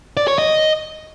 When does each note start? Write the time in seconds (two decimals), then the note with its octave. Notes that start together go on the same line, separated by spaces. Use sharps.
0.17 D5
0.28 C#5
0.38 D#5